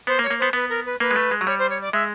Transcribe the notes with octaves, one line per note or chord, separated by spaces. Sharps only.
B3 C5
A#3
C#5
A#3
B3 C5
B3 B4
A#4
B4
A#3 B4
G#3
A3
G#3
F#3
G3 C#5
C5
C#5
D5
G#3 E5